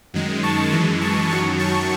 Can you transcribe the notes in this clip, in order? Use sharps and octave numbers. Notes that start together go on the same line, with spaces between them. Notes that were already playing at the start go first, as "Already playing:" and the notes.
F#2 D#3 G#3
A5 C#6
F#2 E3 G#3
A5 C#6
F#2 D#3 F#3 A5 C#6
A5 C#6